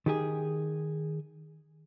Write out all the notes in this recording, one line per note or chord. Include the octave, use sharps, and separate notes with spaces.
D#3 G4 G#4